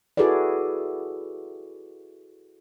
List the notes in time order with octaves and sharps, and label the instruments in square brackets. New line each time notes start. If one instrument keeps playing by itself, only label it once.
[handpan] E4 F#4 G#4 A4 B4 D5